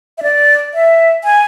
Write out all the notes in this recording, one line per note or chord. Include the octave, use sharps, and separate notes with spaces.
E5
D5
E5
G#5